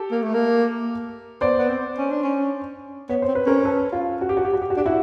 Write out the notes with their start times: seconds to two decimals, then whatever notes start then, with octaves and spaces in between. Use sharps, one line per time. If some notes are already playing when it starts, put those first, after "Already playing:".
Already playing: G4 A4
0.11 A#3
0.22 A3
0.34 A#3
1.41 B3 C5 D5
1.58 B3
1.69 C4
1.98 C#4
2.10 D4
2.23 C#4
3.09 B3 C#5
3.22 C5
3.28 C4
3.35 B4
3.46 C#4 A#4 C5
3.65 A4 B4
3.93 F4
4.21 F#4
4.29 G4
4.37 F#4
4.45 G4
4.53 F#4
4.62 G4
4.70 F#4
4.77 D4 G4
4.86 E4 F#4